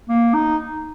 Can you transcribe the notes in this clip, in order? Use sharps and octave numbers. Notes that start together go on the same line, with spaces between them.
A#3
D#4